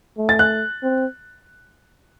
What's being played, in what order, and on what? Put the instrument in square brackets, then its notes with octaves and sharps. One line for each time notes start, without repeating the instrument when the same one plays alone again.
[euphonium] A3
[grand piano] A6
F#6
[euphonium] C4